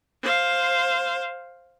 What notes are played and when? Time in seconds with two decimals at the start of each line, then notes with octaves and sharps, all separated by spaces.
0.22 C5 F5